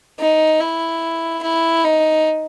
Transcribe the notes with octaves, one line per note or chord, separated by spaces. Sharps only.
D#4
E4
E4
D#4